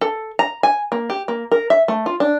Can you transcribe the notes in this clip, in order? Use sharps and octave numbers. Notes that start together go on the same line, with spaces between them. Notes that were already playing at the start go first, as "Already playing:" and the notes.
A4
A#5
G#5
A#3
G4
A#3
A#4
E5
A3
F4
D4